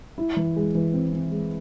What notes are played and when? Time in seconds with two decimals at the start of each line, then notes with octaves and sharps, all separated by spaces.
0.18 E4
0.36 E3
0.56 G#3
0.75 E3
0.94 C4
1.13 C4
1.32 G#3